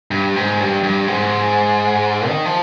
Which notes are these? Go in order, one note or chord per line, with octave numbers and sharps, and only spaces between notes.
G2
G#2
G2
G2
G#2
D#3
F3